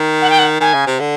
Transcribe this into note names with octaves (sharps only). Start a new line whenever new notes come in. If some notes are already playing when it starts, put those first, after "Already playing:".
Already playing: D#3
F#5
G5
F#5
D#3 G#5
C#3
C3
D3